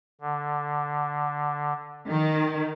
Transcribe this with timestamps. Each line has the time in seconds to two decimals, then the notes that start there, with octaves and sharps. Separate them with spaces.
0.21 D3
2.10 D#3